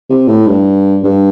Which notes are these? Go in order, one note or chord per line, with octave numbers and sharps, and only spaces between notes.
C3
A2
G2
G2